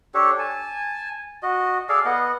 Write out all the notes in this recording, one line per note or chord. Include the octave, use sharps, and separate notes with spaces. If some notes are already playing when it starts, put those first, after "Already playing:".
D4 G4 A4 C#5
G#5 A5
F#4 D#5
G#4 A4 D5 F5
B3 D#5 F#5